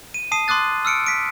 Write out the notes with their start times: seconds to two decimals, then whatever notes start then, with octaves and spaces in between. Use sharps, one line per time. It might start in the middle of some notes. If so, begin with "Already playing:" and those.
0.14 D#7
0.32 A5 D#6 C7 D#7
0.48 C6 D6 D#6 F#6 A6
0.85 E6 F6 C#7 D7
1.06 B6 D7